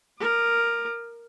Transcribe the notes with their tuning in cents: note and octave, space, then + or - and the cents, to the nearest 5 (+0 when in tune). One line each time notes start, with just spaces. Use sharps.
A#4 +0 D6 +40